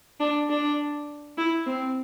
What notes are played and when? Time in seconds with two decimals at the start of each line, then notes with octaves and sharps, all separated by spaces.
0.20 D4
0.50 D4
1.37 E4
1.66 C4